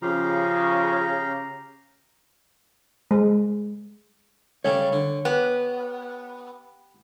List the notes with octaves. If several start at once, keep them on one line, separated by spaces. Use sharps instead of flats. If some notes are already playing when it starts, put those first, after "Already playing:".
C#3 F3 G4 F5 A#5
G#3
C#3 G3 A3 C#5
D3
B3 G4